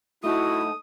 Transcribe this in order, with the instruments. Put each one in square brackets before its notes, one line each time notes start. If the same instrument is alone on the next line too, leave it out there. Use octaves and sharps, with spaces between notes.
[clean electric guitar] A3 D#4 A4 [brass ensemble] E4 [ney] F#4 [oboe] D#6